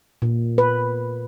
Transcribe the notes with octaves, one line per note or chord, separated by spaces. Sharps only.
A#2
B4